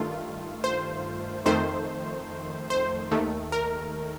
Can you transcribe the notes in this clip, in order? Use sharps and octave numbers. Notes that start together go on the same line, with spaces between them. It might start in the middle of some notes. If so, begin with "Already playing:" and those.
Already playing: G2 D#3 A3 F4
C5
F2 D#3 A3 C5
C5
D#2 D#3 A3
A#4